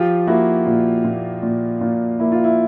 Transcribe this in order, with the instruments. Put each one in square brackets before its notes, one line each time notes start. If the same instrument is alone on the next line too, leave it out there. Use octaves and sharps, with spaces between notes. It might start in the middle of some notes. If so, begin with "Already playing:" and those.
Already playing: [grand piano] F3 F4 G4
A#3 E4 F#4
A#2
A#2
A#2
A#2
A#3 E4
F4
E4